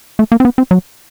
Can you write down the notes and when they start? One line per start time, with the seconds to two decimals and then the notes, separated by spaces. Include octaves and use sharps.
0.19 A3
0.32 A#3
0.40 C4
0.45 B3
0.58 C4
0.71 F#3